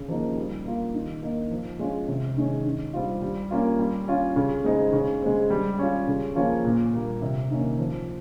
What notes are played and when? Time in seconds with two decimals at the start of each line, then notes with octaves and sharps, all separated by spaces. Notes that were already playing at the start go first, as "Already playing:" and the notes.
Already playing: C#3
0.08 F3 A#3 D#4
0.37 G3
0.65 A#3 F4
0.94 D#3
1.22 A#3 D#4
1.51 F3
1.79 G#3 C#4 F4
2.08 C3
2.37 D#3 G#3 C#4
2.65 D#3
2.93 G3 C4 F4
3.22 G3
3.51 A#3 C#4 F4
3.79 G3
4.08 C#4 F4
4.36 C#3
4.64 G#3 C4 D#4
4.93 C#3
5.21 G#3 C4
5.50 G3
5.79 C#4 F4
6.08 C#3
6.35 F3 A#3 C#4 F4
6.65 A#2
6.93 G3 A#3
7.22 C3
7.50 D#3 A#3 C#4
7.79 F3